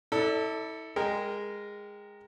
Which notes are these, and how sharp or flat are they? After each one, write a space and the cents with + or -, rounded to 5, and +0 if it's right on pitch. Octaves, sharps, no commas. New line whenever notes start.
E4 -35 A4 +10 D5 +0
G#3 -15 A#4 +0 G5 +0